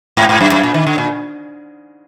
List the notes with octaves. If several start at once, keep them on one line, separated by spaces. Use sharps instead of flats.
G#2
G#2
F#2
F#2
A#2
D#3
D3
A#2